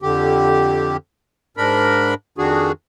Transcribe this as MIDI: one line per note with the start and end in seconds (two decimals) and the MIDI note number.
0.02 0.97 41
0.02 0.97 50
0.02 0.97 67
1.57 2.14 44
1.57 2.14 62
1.57 2.14 70
1.57 2.14 83
2.38 2.72 41
2.38 2.72 51
2.38 2.72 62
2.38 2.72 66
2.38 2.72 68